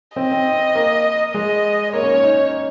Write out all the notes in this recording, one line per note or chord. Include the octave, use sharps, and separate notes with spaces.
C4 D#5
C4
A#3
G#3 D#5
A#3 C#5
C#4
C#4
D#4